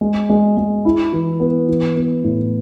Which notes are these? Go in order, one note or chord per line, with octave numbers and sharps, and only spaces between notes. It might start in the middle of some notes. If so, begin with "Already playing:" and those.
G#3
G#3
G#3
E4
E3
B3
E3
B3
A2